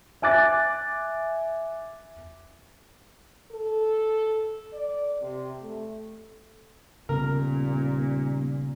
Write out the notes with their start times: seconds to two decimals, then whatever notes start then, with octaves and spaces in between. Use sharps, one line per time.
0.22 E5 G#5 D6 F#6 A6
3.52 A4
4.73 D5
5.22 C3
5.61 A3
7.09 D#1 A#2 C#3 B3 A#4